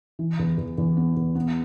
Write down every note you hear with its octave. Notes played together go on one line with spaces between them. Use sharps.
E3
E2
E2
E2
B3
E2
B3